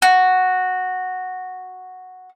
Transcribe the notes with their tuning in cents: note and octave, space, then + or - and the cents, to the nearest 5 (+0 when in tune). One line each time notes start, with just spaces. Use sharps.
F#4 -5